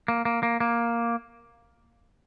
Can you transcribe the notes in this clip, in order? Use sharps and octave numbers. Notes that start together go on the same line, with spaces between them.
A#3
A#3
A#3
A#3